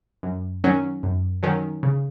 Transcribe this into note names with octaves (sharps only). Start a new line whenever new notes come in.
F#2
D#3 F#3 C#4
F#2
D#3 F#3 C#4
C#3